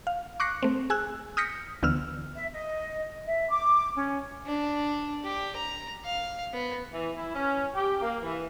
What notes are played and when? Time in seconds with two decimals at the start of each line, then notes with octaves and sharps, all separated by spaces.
0.07 F5
0.40 C#6 D6 F#6 A#6 C7 C#7
0.63 A3 C4
0.90 G#4 G#5 E6 F#6
1.37 D#6 F6 G6 A#6 B6 C#7
1.83 D2 D3 E3 B3 E6 F6
2.34 E5
2.53 D#5
3.26 E5
3.50 D6
3.96 C#4
4.46 D4
5.24 G4
5.56 A#5
6.05 F5
6.54 B3
6.93 E3
7.16 E4
7.34 C#4
7.74 G4
8.01 A#3
8.22 E3